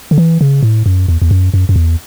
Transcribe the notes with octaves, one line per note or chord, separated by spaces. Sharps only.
D3
E3
C#3
A2
F#2
E2
E2
F#2
F#2
F#2
E2